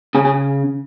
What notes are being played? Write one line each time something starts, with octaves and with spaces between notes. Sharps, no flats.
C#3 G#4
G#4